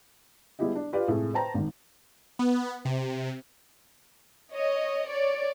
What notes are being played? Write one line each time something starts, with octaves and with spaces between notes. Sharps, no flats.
G3 G#3 B3 E4 G4 D#5
D4
F4 G4 B4 D5 F5
A2 C3 G#3 A3
B4 C5 G5 A5 A#5
G#1 D#3
B3
C3
C#5 D#5
C#5 D5